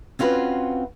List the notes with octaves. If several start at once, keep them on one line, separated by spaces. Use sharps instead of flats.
C4 C#4 F4 F#4 B4